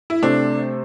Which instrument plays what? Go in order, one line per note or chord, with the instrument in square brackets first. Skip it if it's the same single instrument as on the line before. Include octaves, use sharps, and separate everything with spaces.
[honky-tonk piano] E4
[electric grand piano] C3 A3 C4 A4 C5 [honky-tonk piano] D4